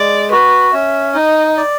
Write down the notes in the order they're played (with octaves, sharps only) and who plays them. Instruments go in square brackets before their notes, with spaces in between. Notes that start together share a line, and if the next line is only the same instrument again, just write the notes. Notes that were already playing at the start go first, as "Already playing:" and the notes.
Already playing: [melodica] G#3 [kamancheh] D5
[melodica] F#4 [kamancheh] B4
[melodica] C#4 [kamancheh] E5
[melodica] D#4 [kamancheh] D#5
[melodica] D5